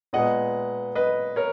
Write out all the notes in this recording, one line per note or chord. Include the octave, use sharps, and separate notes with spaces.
A#2 G#3 B3 D#5 F#5
B4 D#5
A#4 C#5